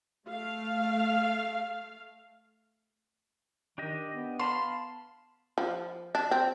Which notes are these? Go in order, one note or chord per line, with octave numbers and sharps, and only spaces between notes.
A3 F5
D#3 D4 G4 D#5
B3
F5 A5 B5 C6
F3
D4
C4